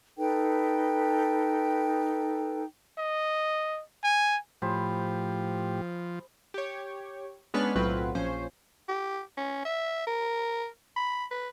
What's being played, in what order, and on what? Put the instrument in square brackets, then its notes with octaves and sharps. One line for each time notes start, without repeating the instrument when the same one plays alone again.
[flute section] D#4 A4 B4 G5
[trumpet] D#5
G#5
[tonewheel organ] A2 G4 [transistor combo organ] F3 [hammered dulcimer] G#4 C5 B5
[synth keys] G4 C#5
G#3 B3 C#4 D4 B4 F6
B1 A2 F#3 C4 F4 B4
A#1 F3 C#4 C5
[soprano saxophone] G4
C#4
E5
A#4
B5
B4